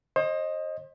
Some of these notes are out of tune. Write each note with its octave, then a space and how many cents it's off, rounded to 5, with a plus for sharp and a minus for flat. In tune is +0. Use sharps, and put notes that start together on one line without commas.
C5 +35 D#5 +0